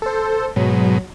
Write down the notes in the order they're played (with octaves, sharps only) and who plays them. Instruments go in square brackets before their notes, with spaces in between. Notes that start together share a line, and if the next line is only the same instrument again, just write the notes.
[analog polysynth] A4 C5
[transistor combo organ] G#2 B2 [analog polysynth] F#3